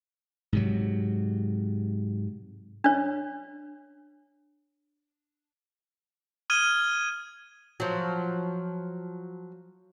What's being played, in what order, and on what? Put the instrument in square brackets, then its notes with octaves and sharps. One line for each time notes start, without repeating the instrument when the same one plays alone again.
[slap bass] G#2 C3 F#3
[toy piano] D4 C#5
[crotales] D#6 F6 G#6 D#7 G7
[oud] F3 F#3